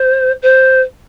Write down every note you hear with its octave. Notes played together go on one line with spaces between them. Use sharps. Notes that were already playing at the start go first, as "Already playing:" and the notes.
Already playing: C5
C5